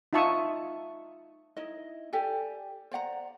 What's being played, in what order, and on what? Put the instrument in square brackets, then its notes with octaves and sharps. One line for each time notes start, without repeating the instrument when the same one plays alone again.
[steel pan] D#4 F4 E5 A5 C#6 D#6
[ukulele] D#4 E4 D#5
G4 A4 D5 G#5
C5 D5 F#5 A#5